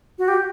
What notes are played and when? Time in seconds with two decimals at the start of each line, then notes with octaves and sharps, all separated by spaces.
0.19 F#4
0.28 G4